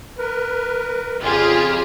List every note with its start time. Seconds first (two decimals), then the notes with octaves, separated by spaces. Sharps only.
0.18 A#4 B4
1.21 F2 C#3 F4 G4 G#4